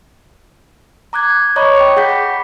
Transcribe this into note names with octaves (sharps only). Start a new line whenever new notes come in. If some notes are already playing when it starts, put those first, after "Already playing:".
A#5 D6 F#6 G#6
C#5 D#5 A#5 B5 C#6 D6
G5 C#7
G#4 F#5 G5 D6 G6 B6
B5